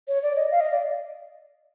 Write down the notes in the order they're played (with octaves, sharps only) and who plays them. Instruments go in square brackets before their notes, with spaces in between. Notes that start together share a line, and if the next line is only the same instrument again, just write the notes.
[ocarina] C#5
D5
D#5
F5
D#5
D5